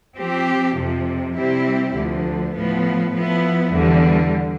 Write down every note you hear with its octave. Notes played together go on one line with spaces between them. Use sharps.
F3 C4 G4
F2 C3 F3
C3 G3 C4 E4 G4
D2 D3 F3
A2 F3 B3
F3 B3 E4
E2 D3 G3